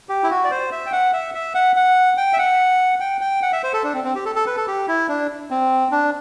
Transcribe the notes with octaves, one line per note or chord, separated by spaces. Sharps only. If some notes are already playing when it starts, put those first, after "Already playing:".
G4
E4
F#4
D5
C5
E5
G5
F#5
E5
E5
F#5
F#5
G5
E5
F#5
G5
G5
F#5
E5
C5
A4
D4
C4
C4
G4
A4
A4
B4
A4
G4
E4
D4
C4
D4